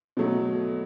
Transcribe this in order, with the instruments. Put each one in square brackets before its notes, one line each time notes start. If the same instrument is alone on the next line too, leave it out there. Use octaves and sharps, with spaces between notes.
[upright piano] B2 F#3 A3